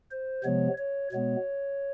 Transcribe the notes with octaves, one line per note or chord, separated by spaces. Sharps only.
C5
C3 F3 G#3 B3 C#5
C#5
B2 G#3 B3 C#5